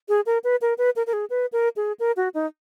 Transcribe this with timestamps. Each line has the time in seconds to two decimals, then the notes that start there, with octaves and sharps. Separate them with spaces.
0.09 G#4
0.26 A#4
0.44 B4
0.62 A#4
0.78 B4
0.96 A#4
1.07 A#4
1.13 G#4
1.30 B4
1.53 A#4
1.76 G#4
2.00 A#4
2.17 F#4
2.34 D#4